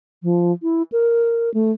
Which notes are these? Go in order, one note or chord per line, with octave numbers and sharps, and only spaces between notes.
F3
E4
A#4
A3